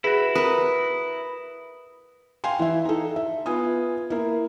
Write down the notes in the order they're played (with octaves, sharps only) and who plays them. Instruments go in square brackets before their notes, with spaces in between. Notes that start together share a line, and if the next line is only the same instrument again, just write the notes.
[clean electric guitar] E4 F#4 [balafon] G#4 [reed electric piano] B4
[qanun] A#4 B4 [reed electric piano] D#6
[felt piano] F5 G5 G#5 C6
E3 E4 E5
D#4 A4
E5
B3 F4 G#5 D#6
A#3 E4